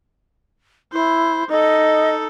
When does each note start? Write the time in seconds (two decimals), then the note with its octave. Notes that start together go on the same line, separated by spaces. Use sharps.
0.93 E4 C5
1.49 D#4 A4 D#5